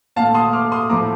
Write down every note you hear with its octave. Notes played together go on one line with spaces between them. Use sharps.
A#2 A3 F5 A5
C6 D#6
D6 F6
C6 D#6
A2 F3 A3 A#5 D6